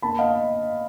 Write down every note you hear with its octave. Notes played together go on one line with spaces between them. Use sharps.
A#3 A5 B5
D#5 F5